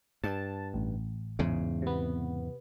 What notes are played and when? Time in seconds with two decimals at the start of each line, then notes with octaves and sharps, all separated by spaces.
0.24 G2 A5
0.74 A1
1.39 E2 G#2 C#3
1.82 C3 B3